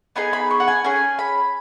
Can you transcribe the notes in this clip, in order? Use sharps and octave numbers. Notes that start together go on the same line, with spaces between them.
B3 D#4 G#4 G#5
B5
C#6
F#5
G#5
C#4 G#4 G#5
B5